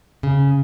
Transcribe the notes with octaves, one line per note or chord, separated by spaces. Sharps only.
C#3